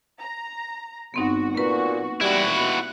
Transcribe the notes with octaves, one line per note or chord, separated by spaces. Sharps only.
A#5
G1 B3 C4 D#4 F#4
A#2 A#3 F#4 B4 C#6
G3 E4 F#4 F#6
B2 B5